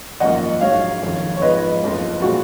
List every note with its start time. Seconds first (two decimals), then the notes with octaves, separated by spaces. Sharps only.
0.20 G#1 F#2 F3 A#3 D#5 F#5
0.61 A#1 G#2 F#3 C#5 F5
1.02 F#1 F2 D#3
1.36 C#5
1.42 G#1 G#2 F3 B3 B4 D#5
1.82 F#1 F2 F3
2.22 A#2 G#3 B3 F#4